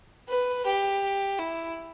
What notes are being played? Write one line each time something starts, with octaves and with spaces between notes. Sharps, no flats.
B4
G4
E4